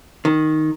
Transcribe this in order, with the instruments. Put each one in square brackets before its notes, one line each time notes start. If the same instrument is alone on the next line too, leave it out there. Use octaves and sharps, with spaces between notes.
[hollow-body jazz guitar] D#3